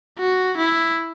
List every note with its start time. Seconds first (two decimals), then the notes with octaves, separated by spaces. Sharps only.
0.19 F#4
0.57 E4